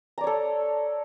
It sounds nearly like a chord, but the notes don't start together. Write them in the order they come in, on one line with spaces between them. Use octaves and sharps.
A#5 D5 C#5 A4